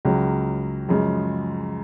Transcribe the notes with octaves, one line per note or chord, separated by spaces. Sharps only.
C#2 C#3 F#3
F#2 C#3 F3 G#3